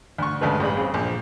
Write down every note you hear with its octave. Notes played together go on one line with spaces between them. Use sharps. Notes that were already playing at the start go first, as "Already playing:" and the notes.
D2 C#6
D2 C#3 G#3 A4 B4
A1 G3 G#4 B5
C#3 C4
A#1